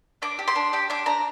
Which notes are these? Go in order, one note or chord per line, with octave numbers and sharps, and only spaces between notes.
D4 D6
G4
C6
D4
G4 D6
D4 D6
D4 A#5